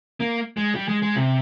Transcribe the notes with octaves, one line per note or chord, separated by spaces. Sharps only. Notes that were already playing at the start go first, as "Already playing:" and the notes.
A#3
G#3
G3
G#3
G#3
C3